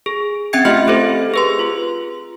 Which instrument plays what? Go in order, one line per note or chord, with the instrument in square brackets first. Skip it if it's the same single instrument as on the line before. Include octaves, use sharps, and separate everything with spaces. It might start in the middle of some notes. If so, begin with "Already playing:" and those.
[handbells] G#4
C4 C#4 E5 G5 G#6 C#7
A3 F4 G4 D#5 F6 C#7
C4 G4 A4 C5
G#4 B4 C6
F4